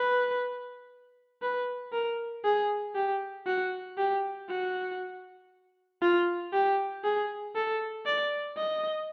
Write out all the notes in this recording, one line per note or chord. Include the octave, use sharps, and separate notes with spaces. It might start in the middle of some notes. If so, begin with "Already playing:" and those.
Already playing: B4
B4
A#4
G#4
G4
F#4
G4
F#4
F4
G4
G#4
A4
D5
D#5